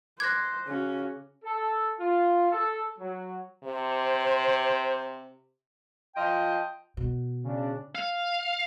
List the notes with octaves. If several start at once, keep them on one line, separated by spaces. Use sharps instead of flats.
C5 D6 F#6 G#6 A#6
C#3 C#4 F#4
A4
F4
A4
F#3
C3 C5
F3 F4 D#5 G5
B2
C#3 D4
F5